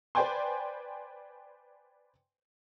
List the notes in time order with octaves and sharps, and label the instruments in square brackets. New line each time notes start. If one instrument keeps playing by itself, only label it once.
[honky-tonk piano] B4 C5 D5 G5 G#5 C6